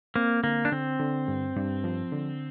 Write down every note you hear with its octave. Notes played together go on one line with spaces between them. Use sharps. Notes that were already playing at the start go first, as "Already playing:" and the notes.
A#3 C4
D3 A#3
D4
D3 C4
D3
G2
G2
F3
D3